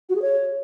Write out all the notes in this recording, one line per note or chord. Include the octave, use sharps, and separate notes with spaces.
F#4
G#4
C#5